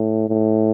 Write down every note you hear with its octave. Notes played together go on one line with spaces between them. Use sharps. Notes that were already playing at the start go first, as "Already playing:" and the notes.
Already playing: A2
A2